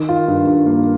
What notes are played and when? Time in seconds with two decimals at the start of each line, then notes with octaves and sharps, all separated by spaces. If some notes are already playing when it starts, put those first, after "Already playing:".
Already playing: D#3
0.09 F4
0.28 G2
0.47 G2
0.66 A#3